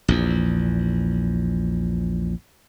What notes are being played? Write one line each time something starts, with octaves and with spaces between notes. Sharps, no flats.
A#1 E2